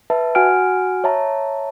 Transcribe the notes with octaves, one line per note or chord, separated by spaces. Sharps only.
B4 E5 A5
F#4 F#5 G#5 F6 D7
C#5 E5 A5 A#5